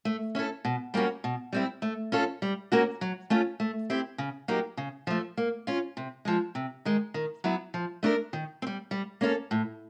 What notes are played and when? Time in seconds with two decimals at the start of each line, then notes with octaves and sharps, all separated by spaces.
0.05 A3
0.35 C#4 E4 A4
0.65 B2
0.94 G3 A#3 C#4 F#4
1.24 B2
1.53 G3 C4 E4
1.82 A3
2.12 C#4 F4 A4
2.42 G3
2.72 A#3 C#4 F#4 A#4
3.01 F#3
3.30 A3 C#4 F4
3.60 A3
3.90 C4 E4 G4
4.18 C#3
4.48 F#3 A#3 D#4 G4
4.77 C#3
5.07 F3 A3
5.37 A#3
5.67 C#4 F4
5.97 C3
6.25 F3 G#3
6.55 C3
6.85 D#3 G#3
7.14 D#3
7.44 F#3 B3 E4
7.74 F3
8.03 A3 D4 G4 A#4
8.33 D#3
8.62 C4
8.67 G3
8.91 G3
9.21 A#3 C#4 E4 A4
9.51 A2